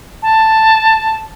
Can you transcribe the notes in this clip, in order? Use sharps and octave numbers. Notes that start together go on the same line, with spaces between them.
A5